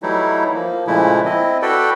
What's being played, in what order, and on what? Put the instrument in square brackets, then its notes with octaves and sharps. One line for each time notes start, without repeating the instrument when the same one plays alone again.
[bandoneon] E3 F#3 G3 A3 D#4 E4
F3 A#3
A#2 C#3 F3 G#3 A3 E4
C4 E4 D#5
F#4 A4 B4 D5 G5